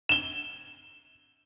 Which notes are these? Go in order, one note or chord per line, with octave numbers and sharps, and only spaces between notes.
E7 G7